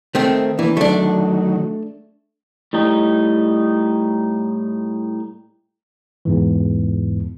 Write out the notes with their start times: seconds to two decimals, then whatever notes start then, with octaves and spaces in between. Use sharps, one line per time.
0.15 D#3 A3 C4
0.59 E3 A#3 D4
0.77 D#3 F#3 A3 D4
2.73 A2 G3 D#4
6.25 E2 G#2 E3